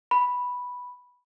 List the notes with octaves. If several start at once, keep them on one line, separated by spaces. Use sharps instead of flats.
B5